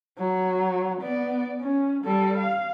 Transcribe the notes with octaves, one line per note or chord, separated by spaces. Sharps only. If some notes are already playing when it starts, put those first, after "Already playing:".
F#3
B3 D5
C#4
G3 A4
F5